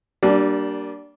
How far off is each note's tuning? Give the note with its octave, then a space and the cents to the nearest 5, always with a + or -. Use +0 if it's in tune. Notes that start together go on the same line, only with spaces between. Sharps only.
G3 -25 A#3 +0 D4 +0